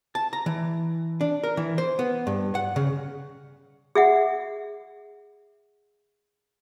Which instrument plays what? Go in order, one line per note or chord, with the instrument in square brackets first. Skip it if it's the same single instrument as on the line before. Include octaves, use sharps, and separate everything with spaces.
[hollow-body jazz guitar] A5
A#5
E3
D4
A#4
E3
C5
B3
G2
F#5
C#3
[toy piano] G#4 E5 F#5